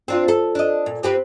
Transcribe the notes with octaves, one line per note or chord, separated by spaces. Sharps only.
C4 D4 F4
A4
D4 D#5
A#2
C4 G4 B4